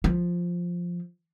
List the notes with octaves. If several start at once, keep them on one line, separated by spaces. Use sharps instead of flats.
F3